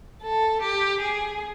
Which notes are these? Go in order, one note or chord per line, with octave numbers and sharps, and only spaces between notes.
A4
G4
G#4